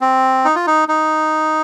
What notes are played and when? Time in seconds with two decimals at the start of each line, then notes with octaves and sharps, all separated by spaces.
0.01 C4
0.45 D#4
0.55 F4
0.67 D#4
0.88 D#4